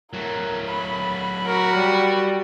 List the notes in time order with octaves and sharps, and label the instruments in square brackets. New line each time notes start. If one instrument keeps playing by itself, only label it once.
[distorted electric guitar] F#3 A3 [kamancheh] A#4
[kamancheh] B5
[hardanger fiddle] F#4 [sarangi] A#4
[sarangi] G3